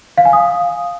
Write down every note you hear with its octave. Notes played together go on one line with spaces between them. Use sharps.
F5
G#5
D#6